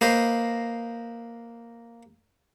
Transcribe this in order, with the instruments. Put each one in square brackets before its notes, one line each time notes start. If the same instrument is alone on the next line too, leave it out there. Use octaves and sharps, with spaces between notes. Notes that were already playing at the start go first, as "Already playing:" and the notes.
[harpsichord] A#3 B4 C5 D#5